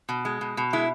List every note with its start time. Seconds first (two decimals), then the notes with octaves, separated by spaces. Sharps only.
0.09 B2
0.25 G#3
0.41 B2
0.57 B2
0.73 G#3 E4